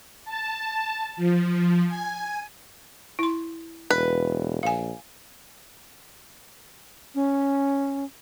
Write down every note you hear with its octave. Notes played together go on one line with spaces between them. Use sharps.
A5
F3
G#5
E4 C6
E1 B4
A#1 F5 G#5
C#4